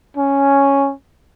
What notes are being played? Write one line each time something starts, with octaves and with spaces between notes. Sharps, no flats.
C#4